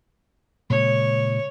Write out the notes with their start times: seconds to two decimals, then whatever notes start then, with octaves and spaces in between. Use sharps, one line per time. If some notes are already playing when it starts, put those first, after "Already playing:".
0.70 A#2 C#3 G#3 C#5